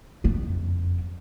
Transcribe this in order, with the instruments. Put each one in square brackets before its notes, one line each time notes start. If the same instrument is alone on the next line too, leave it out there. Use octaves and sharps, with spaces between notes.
[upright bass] F#1 F2